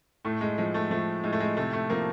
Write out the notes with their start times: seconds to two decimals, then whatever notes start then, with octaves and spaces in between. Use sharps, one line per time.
0.25 A2 A3
0.41 G#3
0.58 F3 G#3
0.74 A3
0.91 F3 A3
1.24 A2 G#3
1.32 A3
1.40 G#3
1.57 C3 A3
1.73 A3
1.90 F3 A#3